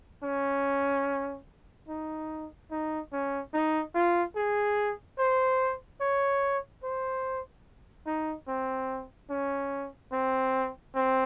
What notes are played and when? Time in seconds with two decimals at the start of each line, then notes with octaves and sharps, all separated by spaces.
0.24 C#4
1.89 D#4
2.71 D#4
3.13 C#4
3.54 D#4
3.95 F4
4.36 G#4
5.18 C5
6.01 C#5
6.83 C5
8.07 D#4
8.48 C4
9.30 C#4
10.12 C4
10.95 C4